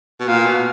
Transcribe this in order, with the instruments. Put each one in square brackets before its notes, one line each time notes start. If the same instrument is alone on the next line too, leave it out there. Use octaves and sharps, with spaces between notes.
[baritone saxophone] B2
[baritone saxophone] A#2 [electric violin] F5
[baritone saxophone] B2